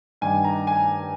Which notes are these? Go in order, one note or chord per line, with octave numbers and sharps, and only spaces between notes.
G2 D#3 G#5
A#5
G#5